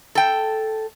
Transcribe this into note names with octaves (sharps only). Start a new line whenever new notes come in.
A4 G5